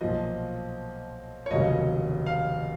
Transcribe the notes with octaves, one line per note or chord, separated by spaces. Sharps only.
B1 A#2 F3 D#5
C#5
F1 D#2 C#3 F#3 D#5
F5